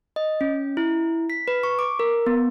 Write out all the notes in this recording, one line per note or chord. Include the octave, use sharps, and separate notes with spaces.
D#5
C#4
E4
B6
B4
C#6
D6
A#4
B3